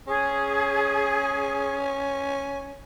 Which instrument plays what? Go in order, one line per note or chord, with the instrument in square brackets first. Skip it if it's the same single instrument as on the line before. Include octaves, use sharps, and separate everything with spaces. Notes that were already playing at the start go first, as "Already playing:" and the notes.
[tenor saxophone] C#4 [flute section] G#4